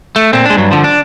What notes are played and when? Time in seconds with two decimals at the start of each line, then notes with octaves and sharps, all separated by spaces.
0.16 A3
0.33 A#2 C4
0.46 G#3 D4
0.57 G2 F#3
0.71 D3 F3
0.84 D4